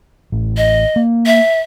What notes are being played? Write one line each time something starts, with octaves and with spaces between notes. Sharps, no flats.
A1
D#5
A#3
E5